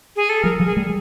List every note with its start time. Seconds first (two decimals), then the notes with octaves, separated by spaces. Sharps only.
0.16 G#4
0.29 A4
0.43 F3 G3 A#4
0.60 F3 G3
0.65 G#4
0.77 G3 A3